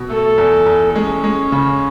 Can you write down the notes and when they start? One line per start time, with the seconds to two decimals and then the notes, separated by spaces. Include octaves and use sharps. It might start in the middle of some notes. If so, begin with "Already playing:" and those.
Already playing: B2
0.10 A3 A4
0.38 E2
0.66 E2
0.95 G#3 C#4
1.24 G#3
1.52 C#3